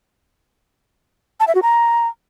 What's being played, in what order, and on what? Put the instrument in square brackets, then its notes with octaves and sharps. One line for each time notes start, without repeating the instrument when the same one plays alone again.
[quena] A5
E5
F#4
A#5